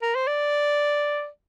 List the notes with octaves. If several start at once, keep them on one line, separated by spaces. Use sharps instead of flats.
A#4
C5
D5